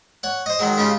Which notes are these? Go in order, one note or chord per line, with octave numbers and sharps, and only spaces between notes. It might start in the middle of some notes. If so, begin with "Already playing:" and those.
C#5 F#5
C5 D#5
D#3 F#3 G#3
C#3 G#3 C#4 F4 G4